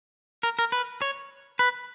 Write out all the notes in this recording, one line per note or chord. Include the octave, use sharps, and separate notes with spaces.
A#4
A#4
B4
C#5
B4